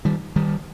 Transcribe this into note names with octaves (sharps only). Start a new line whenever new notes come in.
D#3 G3
D#3 G3